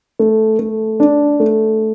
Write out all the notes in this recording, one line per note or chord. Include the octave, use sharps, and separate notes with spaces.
A3
A3
D4
A3